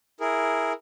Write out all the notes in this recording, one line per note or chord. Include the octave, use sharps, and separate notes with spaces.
E4 G#4 A#4